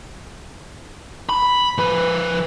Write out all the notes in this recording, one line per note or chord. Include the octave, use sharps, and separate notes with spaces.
B5
F3 B4